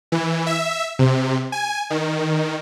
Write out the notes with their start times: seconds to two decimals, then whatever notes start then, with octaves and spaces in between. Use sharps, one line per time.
0.12 E3
0.46 E5
0.99 C3
1.52 G#5
1.90 D#3